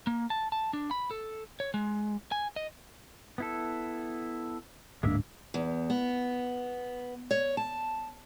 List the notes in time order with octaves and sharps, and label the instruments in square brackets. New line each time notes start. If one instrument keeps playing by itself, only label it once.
[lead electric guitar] A#3
A5
A5
D4
B5
A4
C#5
G#3
G#5
D#5
[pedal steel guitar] B3 E4 A4
[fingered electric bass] D1 G#2 D4 [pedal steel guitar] G#3 A#3 E5
[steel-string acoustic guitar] E2
B3
C#5
A5